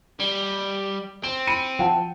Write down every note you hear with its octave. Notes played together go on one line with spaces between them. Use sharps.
G3
C4 D7
B5 C#7 D#7
F3 F#5 G5 A5